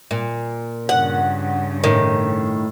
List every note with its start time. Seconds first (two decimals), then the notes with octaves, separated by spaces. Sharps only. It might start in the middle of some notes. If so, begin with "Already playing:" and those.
0.11 A#2
0.89 G2 C#3 F#5
1.84 A2 D#3